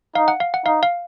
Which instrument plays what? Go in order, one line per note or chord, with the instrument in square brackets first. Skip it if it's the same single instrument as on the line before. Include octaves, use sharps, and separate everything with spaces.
[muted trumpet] D#4 [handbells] F5
[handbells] F#5
F5
F#5
[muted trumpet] D#4 [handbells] F5
[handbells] F5